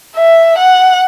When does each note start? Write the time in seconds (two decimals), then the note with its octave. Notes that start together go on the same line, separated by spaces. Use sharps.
0.16 E5
0.58 F#5